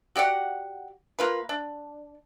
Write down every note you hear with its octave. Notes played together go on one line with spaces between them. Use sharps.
F#4 G4 D5 F#5
A#3 F4 B4
D4